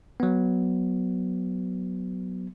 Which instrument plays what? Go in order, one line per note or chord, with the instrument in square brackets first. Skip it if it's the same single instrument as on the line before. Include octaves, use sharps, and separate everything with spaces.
[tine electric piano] F#3 B3